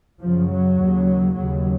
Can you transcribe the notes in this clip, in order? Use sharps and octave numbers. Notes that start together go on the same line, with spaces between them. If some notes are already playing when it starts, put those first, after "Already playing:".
F#2 C#3 F3
F#3
D#2 C#3
D#2 C#3 F#3